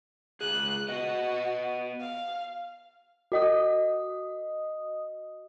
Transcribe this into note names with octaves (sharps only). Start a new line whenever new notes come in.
C#2 G#4 F#6
B3 F#4 D#5
F5
F#4 D#5 D#6